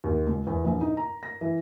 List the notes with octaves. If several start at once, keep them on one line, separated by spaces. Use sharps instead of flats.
D#2
C#2
E2
A#1
D#4
A#5
A#6
E3